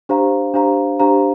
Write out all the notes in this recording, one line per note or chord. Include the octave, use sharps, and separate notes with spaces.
D4 G4 C5 F5 A#5
D4 G4 C5 F5 A#5
D4 G4 C5 F5 A#5